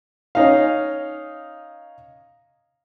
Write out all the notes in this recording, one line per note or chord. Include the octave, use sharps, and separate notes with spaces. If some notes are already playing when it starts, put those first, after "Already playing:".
C#4 D#4 F5